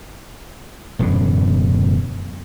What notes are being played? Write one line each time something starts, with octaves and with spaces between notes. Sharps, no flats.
E1 F#2 A2 D3